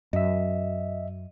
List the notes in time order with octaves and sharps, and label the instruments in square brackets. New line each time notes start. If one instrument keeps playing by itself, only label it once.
[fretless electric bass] F#2 [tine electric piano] D#5 E5